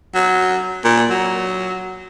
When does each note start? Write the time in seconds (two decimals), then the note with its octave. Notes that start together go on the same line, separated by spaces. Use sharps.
0.15 F#3
0.84 A#2
1.11 F#3